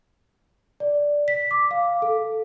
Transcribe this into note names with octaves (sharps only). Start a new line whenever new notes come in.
D5
B6
D6
F5
A4